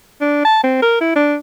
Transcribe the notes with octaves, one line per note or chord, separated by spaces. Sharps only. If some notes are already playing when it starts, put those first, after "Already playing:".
D4
A5
C4
A#4
E4
D4